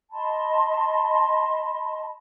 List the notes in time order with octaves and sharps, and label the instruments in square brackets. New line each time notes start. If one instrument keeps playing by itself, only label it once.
[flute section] D#5 A5 B5 C6